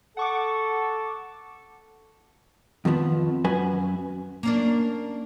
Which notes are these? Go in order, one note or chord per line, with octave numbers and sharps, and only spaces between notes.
A4 F#5 C#6 D6
F2 D#3 F3 B3
F#2 B4 G#5
A#3 C#4 D4